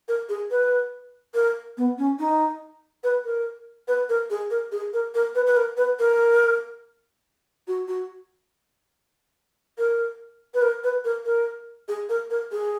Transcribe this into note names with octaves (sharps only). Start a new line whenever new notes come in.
A#4
G#4
B4
A#4
B3
C#4
D#4
B4
A#4
B4
A#4
G#4
A#4
G#4
A#4
A#4
B4
B4
A#4
B4
A#4
F#4
F#4
A#4
B4
A#4
B4
A#4
A#4
G#4
A#4
A#4
G#4